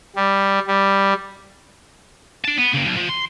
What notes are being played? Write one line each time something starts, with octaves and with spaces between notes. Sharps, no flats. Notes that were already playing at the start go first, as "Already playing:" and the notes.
G3
G3
D4 A5
B3
C#3 A#3
B1
F3
C6